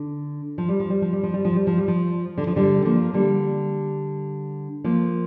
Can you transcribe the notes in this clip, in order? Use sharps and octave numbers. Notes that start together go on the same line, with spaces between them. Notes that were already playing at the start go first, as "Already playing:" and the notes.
Already playing: D3
F3
G3
F3
G3
F3
G3
F3
G3
F3
G3
F3
G3
F3
D3
F3
D3 G3
F3 A#3
D3 G3
F3 A#3